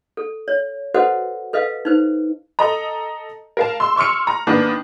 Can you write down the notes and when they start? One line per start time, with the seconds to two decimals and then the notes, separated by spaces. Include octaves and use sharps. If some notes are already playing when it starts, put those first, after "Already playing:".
0.17 A4
0.48 C#5
0.94 F#4 A4 B4 C5 D#5 F#5
1.53 A4 B4 D#5 F5
1.85 D#4 B4 C5
2.59 A4 D#5 A#5
3.57 A#4 F5 A5
3.80 C6 E6
3.96 C6 C#6 E6 F6 C#7
4.27 A#5
4.47 D#3 A#3 B3 D4